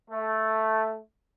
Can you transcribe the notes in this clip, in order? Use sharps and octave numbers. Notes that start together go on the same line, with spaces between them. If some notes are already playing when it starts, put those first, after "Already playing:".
A3